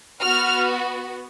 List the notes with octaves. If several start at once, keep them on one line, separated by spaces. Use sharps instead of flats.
B3 F#4 F6